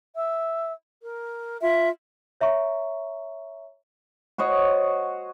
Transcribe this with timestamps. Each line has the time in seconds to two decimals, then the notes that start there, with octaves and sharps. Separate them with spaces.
0.15 E5
1.02 A#4
1.62 F4 E5
2.41 C#5 E5 A#5 C#6
4.38 F#4 C5 C#5 D#5